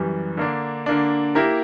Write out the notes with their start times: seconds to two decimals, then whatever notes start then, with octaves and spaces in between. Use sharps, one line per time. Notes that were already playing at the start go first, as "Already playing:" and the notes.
Already playing: F#2 E3 G3
0.37 D3 A#3 D4
0.86 D3 A#3 D4
1.35 A#3 E4 G4 A#4